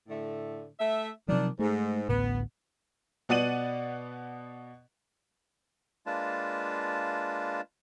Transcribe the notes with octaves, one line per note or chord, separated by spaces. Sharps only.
A2 D3 A3
A3 E5
C3 D#3 F3 F#3 D4
G#2 A3
A1 D2 A2 B3
B2 B3 D5 F#5 D#7 F#7
G#3 A#3 D4 F4 B4 A5